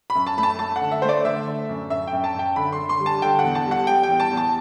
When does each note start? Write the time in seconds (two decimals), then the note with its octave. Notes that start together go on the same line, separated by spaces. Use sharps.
0.10 B5
0.15 F#2
0.27 A5
0.38 A3 B5
0.43 A5
0.59 A3 A5
0.76 F#5
0.81 D3
0.91 E5
1.02 A3 C5
1.09 D5
1.25 D3 E5
1.46 D3
1.69 F#2
1.90 F#2 E5
2.07 G5
2.13 F#2
2.24 A5
2.34 F#2 G5
2.56 D3 B5
2.72 C6
2.78 D3
2.89 C6
3.00 G3
3.06 A5
3.22 D3 G5
3.39 E2 F#5
3.55 A5
3.66 G3
3.71 F#5
3.87 G3 G5
4.03 G5
4.09 E2
4.20 A5
4.32 E2
4.37 A5